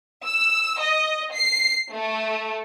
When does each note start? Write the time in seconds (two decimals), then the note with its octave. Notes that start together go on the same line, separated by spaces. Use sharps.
0.24 E6
0.81 D#5
1.34 C7
1.93 A3